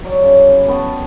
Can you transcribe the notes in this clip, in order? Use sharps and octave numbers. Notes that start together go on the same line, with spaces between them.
F#3 D5
C#3
B5
B3 G5 A5 C#6